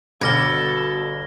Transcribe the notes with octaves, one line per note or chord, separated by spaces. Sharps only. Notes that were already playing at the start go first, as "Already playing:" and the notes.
G1 B2 A4 D6 F6 G#6 A#6 G7